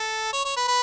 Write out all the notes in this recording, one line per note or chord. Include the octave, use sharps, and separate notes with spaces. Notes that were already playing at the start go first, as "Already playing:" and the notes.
Already playing: A4
C#5
C#5
B4
B4